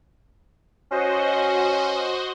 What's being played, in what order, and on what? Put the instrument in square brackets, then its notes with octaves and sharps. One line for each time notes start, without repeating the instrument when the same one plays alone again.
[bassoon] C#4 [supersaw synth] F#4 C5 D#5